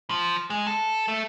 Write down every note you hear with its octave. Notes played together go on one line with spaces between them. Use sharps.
F3
G#3
A4
A3